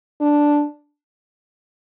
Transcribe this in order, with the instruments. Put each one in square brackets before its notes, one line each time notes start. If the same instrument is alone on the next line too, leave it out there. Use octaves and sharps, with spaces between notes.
[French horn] D4